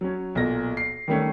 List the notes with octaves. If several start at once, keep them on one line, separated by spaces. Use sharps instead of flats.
F#3 C#4
B1 A#2 A#6
C7
D#3 G3 A3 C#4